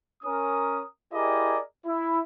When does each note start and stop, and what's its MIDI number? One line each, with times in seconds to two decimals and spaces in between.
0.23 0.81 61
0.23 0.81 70
0.23 0.81 87
1.13 1.57 64
1.13 1.57 67
1.13 1.57 68
1.13 1.57 70
1.13 1.57 74
1.13 1.57 75
1.85 2.19 64